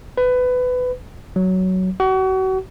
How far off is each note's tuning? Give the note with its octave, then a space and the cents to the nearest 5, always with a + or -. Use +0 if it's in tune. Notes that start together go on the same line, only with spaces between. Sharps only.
B4 +20
F#3 +10
F#4 +35